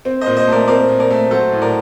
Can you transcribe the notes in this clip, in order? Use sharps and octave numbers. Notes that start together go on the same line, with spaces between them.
C4
C5 D#5
A#2
C5 D#5
A3 A#4 D5
C4 A#4 D5
A#2
A#4 D5
A3
F#3 A4 C5
A2
A#4 D5